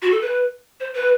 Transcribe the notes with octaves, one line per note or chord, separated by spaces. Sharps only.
F#4
A4
B4
C5
B4